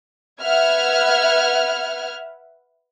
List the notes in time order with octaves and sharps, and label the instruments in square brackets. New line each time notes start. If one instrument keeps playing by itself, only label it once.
[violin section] B4 E5 F#5 F6 G#6